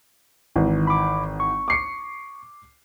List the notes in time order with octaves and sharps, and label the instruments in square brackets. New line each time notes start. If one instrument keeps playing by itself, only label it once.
[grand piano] G#1 E3 [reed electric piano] D#3
[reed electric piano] B5 D6
C#6
[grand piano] D6 C7 C#7